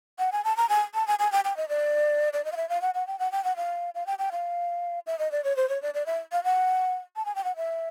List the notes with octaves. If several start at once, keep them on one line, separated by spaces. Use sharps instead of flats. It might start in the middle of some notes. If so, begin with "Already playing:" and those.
F#5
G#5
A5
A#5
G#5
A5
G#5
G#5
G5
G5
D#5
D5
D5
D#5
F5
E5
F5
F#5
F#5
G5
F#5
G5
F#5
F5
F5
G5
G5
F5
E5
D#5
D5
C#5
C5
C#5
D5
D5
E5
F5
F#5
A5
G#5
G5
F#5
E5